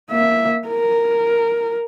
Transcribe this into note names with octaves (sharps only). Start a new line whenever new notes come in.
A#3 E5
A#4